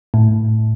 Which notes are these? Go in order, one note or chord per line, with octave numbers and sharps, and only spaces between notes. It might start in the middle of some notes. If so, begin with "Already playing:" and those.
A2